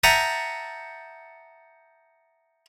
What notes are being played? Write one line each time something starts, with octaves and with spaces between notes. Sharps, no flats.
E5 F#5 G5 A5 A#5 D#6